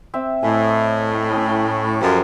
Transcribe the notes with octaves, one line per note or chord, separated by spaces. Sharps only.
C4 E5
A2 D#5 E5 G#5
C#4 G5 D#6
F#2 F3 G4 A4 D#5